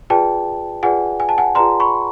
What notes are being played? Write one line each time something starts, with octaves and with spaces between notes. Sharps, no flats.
F4 G#4 B4 D5 G5 A5
F4 G#4 B4 D5 F#5 G#5
G#5
A5
F#5 G#5
F4 G#4 B4 D5 A#5 C6
B5 C#6